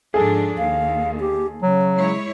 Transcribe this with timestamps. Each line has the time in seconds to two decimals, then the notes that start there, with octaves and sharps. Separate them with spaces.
0.14 G#2 F3 D4 G#4 A4
0.58 D#2 F5
1.20 G4
1.63 C#3 F#3
1.96 G#3 E4 C#5